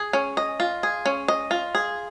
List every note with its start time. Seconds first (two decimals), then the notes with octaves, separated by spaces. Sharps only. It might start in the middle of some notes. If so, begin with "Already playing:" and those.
Already playing: G#4
0.13 C#4
0.37 D#5
0.60 F4
0.83 G#4
1.06 C#4
1.28 D#5
1.51 F4
1.75 G#4